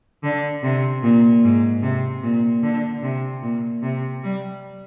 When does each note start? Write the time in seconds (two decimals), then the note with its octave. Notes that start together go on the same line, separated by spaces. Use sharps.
0.23 D3
0.63 C3
1.03 A#2
1.44 G#2
1.83 C3
2.23 A#2
2.63 D3
3.03 C3
3.43 A#2
3.83 C3
4.23 G3